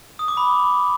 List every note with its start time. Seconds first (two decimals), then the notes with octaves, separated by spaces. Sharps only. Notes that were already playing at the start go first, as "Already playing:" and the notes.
0.19 D#6
0.28 D6
0.37 B5